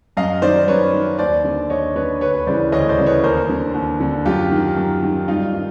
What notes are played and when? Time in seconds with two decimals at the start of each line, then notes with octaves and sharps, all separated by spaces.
0.17 F#2 D#5 F5
0.42 D#3 C5 D5
0.67 F#2 B4 C#5
0.93 D#3
1.19 D#2 C5 D5
1.44 D3
1.70 D#2 C#5 D#5
1.96 D3 B4 C#5
2.21 D2 B4 C#5
2.47 C#3 E3 C5 D5
2.72 D2 C#5 D#5
2.89 C5 D5
2.98 C#3 E3
3.06 B4 C#5
3.23 D#2 A#4 C5
3.49 D3
3.74 D#2
4.00 D3
4.26 F#2 F4 G4
4.52 D#3
4.77 F#2
5.03 D#3
5.28 G2 D#4 F4
5.54 D#3